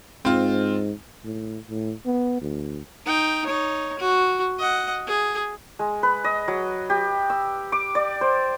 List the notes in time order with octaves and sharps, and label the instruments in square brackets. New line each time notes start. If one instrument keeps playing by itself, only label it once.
[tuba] G#2 [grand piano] C4 F4
[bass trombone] A2
A2
B3
D2
[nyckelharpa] D#4 G5
D#4 C#5
F#4
D#5 F#5
G#4
[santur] G#3
B4
D#5
F#3
G4
E6
D6
D5
C5